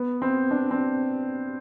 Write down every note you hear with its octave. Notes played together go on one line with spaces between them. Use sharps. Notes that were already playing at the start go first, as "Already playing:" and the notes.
Already playing: B3
C4
D4
C4